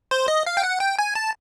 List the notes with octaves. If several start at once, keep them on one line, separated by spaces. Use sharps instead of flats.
C5
D#5
F5
G5
F#5
G5
G#5
A5